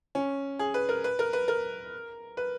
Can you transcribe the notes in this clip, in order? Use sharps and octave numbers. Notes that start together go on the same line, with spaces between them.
C#4
G#4
B4
A#4
B4
A#4
B4
A#4
B4